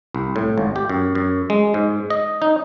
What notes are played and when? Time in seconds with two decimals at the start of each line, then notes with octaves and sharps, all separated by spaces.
0.15 C2
0.36 A2
0.58 G#1
0.76 G4
0.89 F#2
1.15 F#2
1.50 G#3
1.74 G#2
2.10 D#5
2.42 D#4